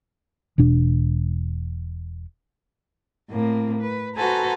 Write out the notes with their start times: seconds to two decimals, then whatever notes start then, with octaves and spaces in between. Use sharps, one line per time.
0.58 E1 B2 D4
3.30 A2 A#3 C4
3.81 B4
4.15 F#4 A4 B4 C5 G#5 A#5